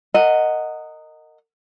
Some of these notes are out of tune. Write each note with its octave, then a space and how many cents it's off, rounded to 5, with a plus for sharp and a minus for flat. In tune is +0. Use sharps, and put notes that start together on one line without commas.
A#4 -25 D#5 +0 F#5 +0